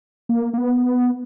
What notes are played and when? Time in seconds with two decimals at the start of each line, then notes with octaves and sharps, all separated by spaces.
0.29 A#3
0.53 A#3
0.58 B3